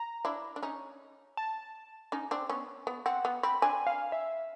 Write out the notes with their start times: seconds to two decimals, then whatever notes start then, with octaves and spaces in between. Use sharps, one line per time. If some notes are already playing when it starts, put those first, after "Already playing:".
Already playing: A#5
0.25 D4 E4
0.56 D4
0.62 C#4 D#4
1.37 A5
2.12 C#4 D#4
2.31 C4 D4
2.49 B3 C#4
2.87 B3
3.06 C4 F#5
3.25 B3
3.43 C4 B5
3.62 C4 D4 G#5
3.87 F5
4.12 E5